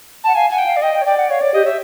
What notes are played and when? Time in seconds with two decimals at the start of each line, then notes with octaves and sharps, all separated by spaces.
0.24 F#5 A5
0.35 F5 G#5
0.50 F#5 G#5
0.58 G5
0.66 F5
0.76 D5
0.82 D#5 G5
0.95 G5
1.01 C#5
1.06 D5 G5
1.18 F#5
1.30 C#5 F5
1.41 C#5 D5
1.54 G4 D#5
1.65 C#5 E5